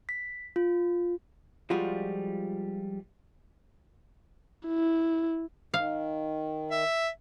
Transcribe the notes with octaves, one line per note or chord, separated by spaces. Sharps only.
B6
F4
F3 G3 G#3 F4 F#4
E4
D#3 F5
E5